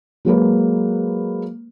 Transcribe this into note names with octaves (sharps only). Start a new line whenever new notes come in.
F#3 G#3 A#3 B4